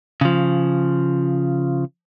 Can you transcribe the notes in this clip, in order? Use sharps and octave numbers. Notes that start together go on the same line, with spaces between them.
C#3 F3